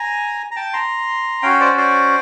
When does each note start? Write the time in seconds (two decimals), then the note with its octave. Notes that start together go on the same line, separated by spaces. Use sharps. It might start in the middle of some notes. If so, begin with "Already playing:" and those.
Already playing: G#5 A#5
0.51 A#5
0.56 G5 A5
0.73 A#5 C6
1.42 C#4 F#4 F5 G5
1.60 C5 D5
1.78 C5 D5